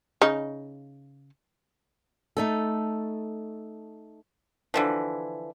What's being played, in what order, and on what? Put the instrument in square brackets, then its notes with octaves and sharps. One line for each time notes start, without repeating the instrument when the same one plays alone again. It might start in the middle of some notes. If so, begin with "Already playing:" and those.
[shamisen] C#3 D#4
[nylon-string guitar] A3 D#4 A4
[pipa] D3 E3 F3